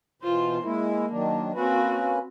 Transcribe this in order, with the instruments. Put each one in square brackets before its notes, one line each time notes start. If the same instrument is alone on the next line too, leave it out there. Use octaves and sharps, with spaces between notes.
[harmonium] B2 E3 [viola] F4 C5
[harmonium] G#3 E4 [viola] A#3
[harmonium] D#3 F#3 D4
[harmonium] A#3 C#4 B4 [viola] C4 F#4